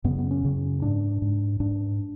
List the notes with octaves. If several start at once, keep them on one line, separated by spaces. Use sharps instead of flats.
F#2 C#3 B3
B3
C#4
F#2 C#3
G#2 D4
G#2
G#2 D4